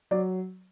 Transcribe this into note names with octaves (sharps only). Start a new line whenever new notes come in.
F#3 D5